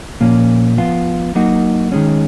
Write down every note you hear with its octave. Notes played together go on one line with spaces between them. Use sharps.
A#2 F3 A#3 C#4
F3 B3 F4
F#3 A#3 D#4 F#4
D#3 G#3 C#4